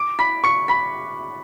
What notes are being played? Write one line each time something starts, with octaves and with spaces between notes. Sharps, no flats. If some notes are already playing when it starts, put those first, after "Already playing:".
Already playing: D6 D7
B5 B6
C#6 C#7
B5 B6